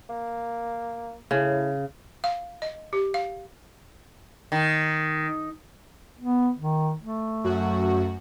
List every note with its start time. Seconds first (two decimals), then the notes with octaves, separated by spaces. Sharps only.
0.10 A#3
1.31 A2 C#3
2.24 F5
2.62 D#5
2.93 G4
3.14 F5
4.52 D#3
6.20 B3
6.59 D#3
7.02 A3
7.44 F#2 F#4